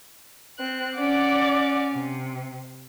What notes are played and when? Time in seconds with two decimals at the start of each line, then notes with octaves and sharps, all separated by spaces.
0.58 C4 F#6
0.97 C#4 D5 F#5 D6
1.91 C3